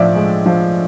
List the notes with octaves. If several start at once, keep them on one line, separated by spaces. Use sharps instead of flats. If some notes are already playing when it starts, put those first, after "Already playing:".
Already playing: A2 F3 D5 E5
G#3
F3